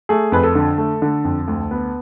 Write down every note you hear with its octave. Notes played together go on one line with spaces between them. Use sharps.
A3 G#4
F2 B4
A4
D3
A3
D3
F2
D2
B3